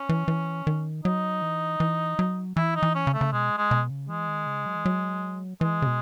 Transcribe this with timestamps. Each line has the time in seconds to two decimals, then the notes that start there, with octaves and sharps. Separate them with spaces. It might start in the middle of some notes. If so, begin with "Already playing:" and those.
Already playing: C#4
0.09 E3
0.28 E3
0.67 D#3
1.04 F#3 D#4
1.42 E3
1.80 E3
2.19 F#3
2.57 E3 E4
2.76 D#4
2.83 E3
2.95 C#4
3.07 C#3
3.14 A3
3.21 C#3
3.32 B2 G#3
3.58 G#3
3.71 B2
3.90 C#3
4.09 E3 G#3
4.28 D#3
4.46 C#3
4.66 F#3
4.75 E3
4.86 F#3
5.61 E3 G#3
5.82 C#3
5.86 B2